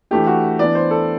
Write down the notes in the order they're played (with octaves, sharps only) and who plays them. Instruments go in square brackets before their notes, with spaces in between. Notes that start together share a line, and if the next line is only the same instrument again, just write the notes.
[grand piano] E3 A3 D4 G4
F#4
E3 B3 D4 D5
C5
A4